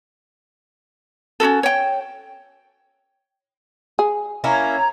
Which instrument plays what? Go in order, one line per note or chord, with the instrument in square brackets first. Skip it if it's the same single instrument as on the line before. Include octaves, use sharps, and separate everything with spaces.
[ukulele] C#4 D#4 F#4 A4
C#5 G5
[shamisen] G#4
[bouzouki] A#3 C#4 E4 [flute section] C#5 A#5